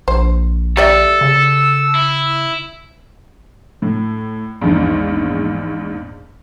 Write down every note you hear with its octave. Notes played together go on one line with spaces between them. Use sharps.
A#1 C5
G4 A4 D5 E5 E6
C#3
E4
A2
A#1 E2 G#2